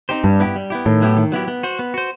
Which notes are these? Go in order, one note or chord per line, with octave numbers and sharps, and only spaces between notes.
C4 D#4 G4 C5
G2 G3
B3 E4 G4
G3
B3 E4 G4
A2 D#3
F#3 B3 E4 G4
D#3
F#3 B3 E4 G4
B3
F#4 C5
B3
F#4 C5